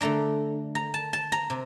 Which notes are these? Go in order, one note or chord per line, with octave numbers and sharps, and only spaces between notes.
D3 A3 D4 A#5
A#5
A5
A5
A#5
C3